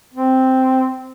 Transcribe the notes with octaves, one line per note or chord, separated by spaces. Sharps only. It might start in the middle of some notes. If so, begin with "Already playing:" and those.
C4